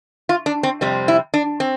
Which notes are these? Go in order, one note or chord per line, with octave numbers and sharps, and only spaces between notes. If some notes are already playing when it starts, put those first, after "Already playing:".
F4
D4
C4
F2 C3 G3 C4
E4
D4
C4